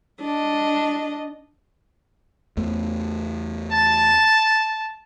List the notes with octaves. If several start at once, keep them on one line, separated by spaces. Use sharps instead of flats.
D4 D#5
E2 A3
A5 A6